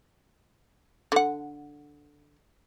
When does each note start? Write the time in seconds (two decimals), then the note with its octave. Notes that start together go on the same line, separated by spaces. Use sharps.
1.12 D3 F#5